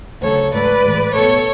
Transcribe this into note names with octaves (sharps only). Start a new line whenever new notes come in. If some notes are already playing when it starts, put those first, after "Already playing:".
D2 C#3 F#3 A3 A4 C#5
G#2 F#3 A3 B4 D5
A2 E3 G#3
B2 A3 A4 C#5